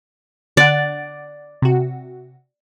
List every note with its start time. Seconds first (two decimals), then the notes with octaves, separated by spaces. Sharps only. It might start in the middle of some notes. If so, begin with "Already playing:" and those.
0.57 D3 D5 F#5
1.62 C3 F#4